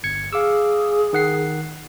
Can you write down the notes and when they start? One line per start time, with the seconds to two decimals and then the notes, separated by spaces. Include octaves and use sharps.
0.04 G1 G#6 C#7
0.33 G#4 F5 D6 E6
1.13 D#3 F#5 C7